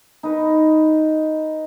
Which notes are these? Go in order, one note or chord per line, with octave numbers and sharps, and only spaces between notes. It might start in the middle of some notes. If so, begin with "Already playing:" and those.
D#4 B4